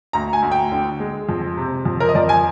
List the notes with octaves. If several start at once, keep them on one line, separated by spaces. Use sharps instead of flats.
D2 A#5
G#5
D2
G5
D3
G#3
F2
C3
F2
A#4
D#5
F2 D5
G#5